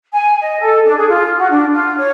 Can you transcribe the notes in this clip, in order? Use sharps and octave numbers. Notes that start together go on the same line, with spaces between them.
G#5
D#5
A4
D4
G#4
F4
F#4
D4
F4
C#5